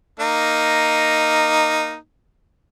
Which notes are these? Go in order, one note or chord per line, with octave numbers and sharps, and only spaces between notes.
A#3 D#4